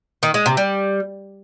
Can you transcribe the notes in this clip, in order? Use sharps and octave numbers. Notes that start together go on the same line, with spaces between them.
D#3
G#3
C3
G3